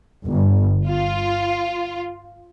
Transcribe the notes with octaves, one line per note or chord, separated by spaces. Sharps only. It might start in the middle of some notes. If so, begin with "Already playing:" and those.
G1
F4